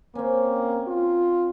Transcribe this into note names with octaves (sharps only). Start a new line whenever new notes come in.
A#3 C4 C#4
F4